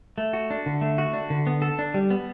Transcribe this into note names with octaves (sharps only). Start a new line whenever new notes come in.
A3
F#4
D4
D3
A3
F#4
D4
D3
B3
A4
D4
G3
B3